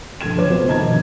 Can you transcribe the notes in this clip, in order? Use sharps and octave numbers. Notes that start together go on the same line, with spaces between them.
G2 F3 A4 G#6 E7
F#1 F3 B4 C#5 D6 G#6
A3 B3 C4 F4 F#4 C5
C3 D#3 D#5 A5 A#5 G#6
G1 D#2 B2 F3